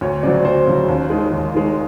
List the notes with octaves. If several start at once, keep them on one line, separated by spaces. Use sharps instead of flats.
D2 C#5
C#3 F#3 C5 D5
D2 C5
C#3 F#3
D#2
D#3 G#3
D#2
D#3 G#3